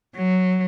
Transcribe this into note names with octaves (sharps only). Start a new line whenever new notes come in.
F#3